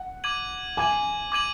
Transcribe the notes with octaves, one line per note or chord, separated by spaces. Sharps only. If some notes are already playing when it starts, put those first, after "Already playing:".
Already playing: F#5
D6 G#6 D#7 F#7
G#5 D6 G#6 D#7 F#7
D6 G#6 D#7 F#7